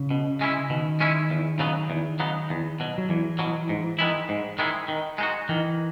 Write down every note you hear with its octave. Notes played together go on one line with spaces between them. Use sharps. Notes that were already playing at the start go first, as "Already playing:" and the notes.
Already playing: C#3
B2
G#3 C#4 E4
B2 D#3
G#3 C#4 E4
E2
C#3 F#3 B3 D#4
E2
C#3 F#3 B3 D#4
E2
B2 F#3
F#3
E2 E3
B2 F#3
G#2
D#3 G#3 B3 E4
G#2
D#3 G#3 B3 E4
D#3
G#3 D#4 F#4
D#3 E3